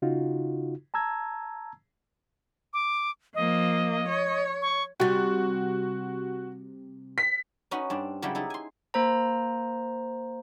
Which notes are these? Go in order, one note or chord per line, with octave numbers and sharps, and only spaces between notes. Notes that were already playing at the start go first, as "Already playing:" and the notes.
C#3 D#4 F4 F#4
A5 A#5 E6 G#6
D6
F3 A#3 D#5
C#5
C#6
C3 G3 F#4
B6
C#4 D#4 F#4 B4
G2 C4 D4
C#3 F#3 G3 E4 G4
D#4 E4 A4
G#5 C6
A#3 C5 A#5